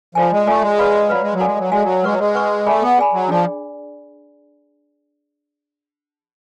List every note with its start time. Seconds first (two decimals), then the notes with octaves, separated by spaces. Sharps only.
0.15 F3 F4 A4 D5 G#5
0.32 G#3
0.46 A3 F4 A4 D5 G#5
0.62 G#3
0.79 B4 D5 F5 B5
1.09 F#3 B4 D5 F5 B5
1.22 G#3
1.34 F#3
1.40 F#4 A4 D5 F5 G#5
1.46 G#3
1.58 F#3
1.71 G#3 F#4 A4 D5 F5 G#5
1.83 F#3
2.04 G#3 B4 F#5 C#6
2.12 F#3
2.19 G#3
2.35 B4 F#5 C#6
2.67 A3 G#4 D5 G#5 B5
2.82 B3
2.98 G#4 D5 G#5 B5
3.13 F#3
3.28 F3 D4 G#4 D5